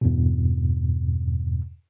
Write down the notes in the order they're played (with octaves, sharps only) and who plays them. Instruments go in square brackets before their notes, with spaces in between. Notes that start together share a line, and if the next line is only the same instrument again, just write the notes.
[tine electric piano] E2 G2 B2